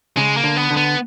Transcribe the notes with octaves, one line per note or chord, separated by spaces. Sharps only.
C#3 G#3
A#3
D3
B3
D3
B3